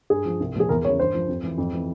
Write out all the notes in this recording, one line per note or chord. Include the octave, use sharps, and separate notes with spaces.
G2 G#4
F3
C2
A#2 F3 G#4
E2 A#4
C#3 E3 C#5
G2 C5
F3
F2
E3
F2
E3